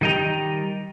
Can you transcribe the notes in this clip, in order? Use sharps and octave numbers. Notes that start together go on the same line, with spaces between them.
D#3 G3 D#5 G5 A#5